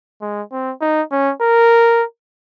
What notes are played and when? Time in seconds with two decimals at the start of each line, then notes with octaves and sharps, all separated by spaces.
0.21 G#3
0.52 C4
0.81 D#4
1.11 C#4
1.41 A#4